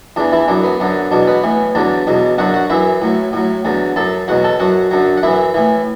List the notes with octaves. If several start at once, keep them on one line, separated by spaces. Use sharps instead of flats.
E2 E3 D4
E3 E4
F#2 F#3 D4
B3
F#2 D3 F#3
E2 B2 F#3 D4
B3 B4
A2 E3
E2 D3 F#3 D4 D5
E2 B2 F#3
F#2 D3 F#3 F#4 F#5
F#4 F#5
F#2 E3 E4 E5
A2 F#3
A2 F#3
E2 D3 F#3
F#2 F#3 A4 A5
E2 B2 F#3 F#4 F#5
A4 A5
F#2 F#3 F#4 F#5
F#2 D3 F#3
F#5
F#2 E3 E4 E5
A2 E3